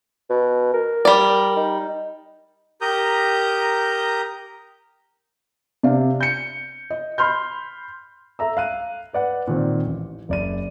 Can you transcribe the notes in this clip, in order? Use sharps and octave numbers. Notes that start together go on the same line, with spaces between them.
B2
A#4
G3 D5
D#4
G4 A#4 A#5 D#6 G6
C3 D4 D5 F5
G6 C#7
D#5
B5 C6 F6 G6
A4 E5 A#5 E6
F5 F#6 D#7
B4 D5 F#5
A#2 D#3 C4
A1
F#1 D5 D#7